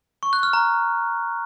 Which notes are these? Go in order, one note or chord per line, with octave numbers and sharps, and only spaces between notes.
C#6
F#6
F6
A#5